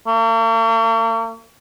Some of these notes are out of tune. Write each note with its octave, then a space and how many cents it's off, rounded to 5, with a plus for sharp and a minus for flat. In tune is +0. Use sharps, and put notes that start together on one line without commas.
A#3 -45